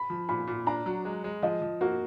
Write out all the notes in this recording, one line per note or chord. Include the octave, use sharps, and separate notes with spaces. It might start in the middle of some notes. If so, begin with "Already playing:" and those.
Already playing: B5
F3
A#2 B5
A#2
D4 A#5
F#3
G#3
G#3
F3 D#5
F3
A#3 F#4